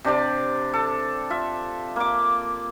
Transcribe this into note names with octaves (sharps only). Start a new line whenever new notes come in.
C3 D4 G4 D5
A4
F4 E5
A#3 D6